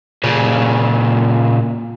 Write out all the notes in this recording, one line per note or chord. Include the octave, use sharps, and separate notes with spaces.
A#2 C#3